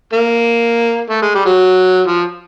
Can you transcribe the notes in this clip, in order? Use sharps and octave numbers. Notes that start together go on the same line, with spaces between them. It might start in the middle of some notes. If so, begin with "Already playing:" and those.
A#3
A3
G#3
G3
F#3
F3